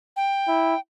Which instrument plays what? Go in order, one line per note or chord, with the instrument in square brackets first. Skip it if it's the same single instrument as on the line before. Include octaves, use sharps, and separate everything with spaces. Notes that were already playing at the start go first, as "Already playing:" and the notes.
[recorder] G5
[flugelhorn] E4